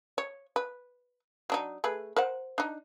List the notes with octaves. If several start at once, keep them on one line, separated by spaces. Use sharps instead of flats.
C#5
B4
F#3 D4 D#4
A3 G#4 B4
A#4 C5 F#5
D4 D#4